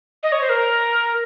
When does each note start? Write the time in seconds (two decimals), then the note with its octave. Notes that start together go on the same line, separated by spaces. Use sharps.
0.23 D#5
0.32 C#5
0.41 C5
0.49 A#4